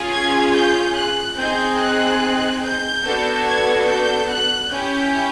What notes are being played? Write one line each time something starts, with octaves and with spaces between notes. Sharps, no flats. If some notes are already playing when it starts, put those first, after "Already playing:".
Already playing: C#4 F4 G#4
G#6
G6
F#6
C4 D#4 G#4 G6
F#6
G6
B3 D4 F#4 A4
G#6
G6
F#6
C#4 E4 G4 G6